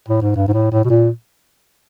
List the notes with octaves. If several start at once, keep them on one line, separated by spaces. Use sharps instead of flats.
A2
G#2
G2
G#2
A2
A2
B2
A#2